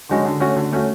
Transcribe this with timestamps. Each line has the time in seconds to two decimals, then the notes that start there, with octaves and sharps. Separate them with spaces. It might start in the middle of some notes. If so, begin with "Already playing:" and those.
0.09 D3 G#3 C#4 F#4
0.25 D3
0.40 A3 C#4 F#4
0.56 D3
0.72 A3 C#4 F#4